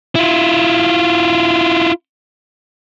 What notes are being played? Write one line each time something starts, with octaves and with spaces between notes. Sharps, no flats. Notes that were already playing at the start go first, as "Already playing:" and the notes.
E4 F4